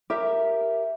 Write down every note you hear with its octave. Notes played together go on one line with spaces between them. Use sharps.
G4 A#4 E5